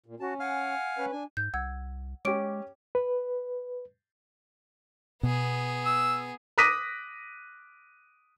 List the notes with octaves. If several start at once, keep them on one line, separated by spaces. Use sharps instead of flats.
A#2
C#4 F#4 A5
F5 F#5 G#5 F6
C#4 B4
D4 G#5
G#2 G6
C2 F#5 E6 G#6
G#3 C#4 G4 D6 D7
B4
B2 B3 G#4
E6
D6 D#6 F#6 A#6 B6 D#7